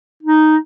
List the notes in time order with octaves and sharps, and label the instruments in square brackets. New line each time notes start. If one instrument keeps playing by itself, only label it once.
[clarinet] D#4